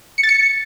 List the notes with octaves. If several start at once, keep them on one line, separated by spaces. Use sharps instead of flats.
C#7
A6
C#7